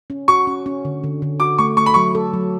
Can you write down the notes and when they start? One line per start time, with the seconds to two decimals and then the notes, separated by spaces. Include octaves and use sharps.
0.10 C#4
0.28 F#4 C#6
0.47 C#4
0.66 C#4
0.85 D3
1.04 D3
1.22 D3
1.40 F#4 D6
1.58 A3 C#6
1.77 A3 C#6
1.86 B5
1.94 F#3 C#6
2.15 A4
2.34 F#3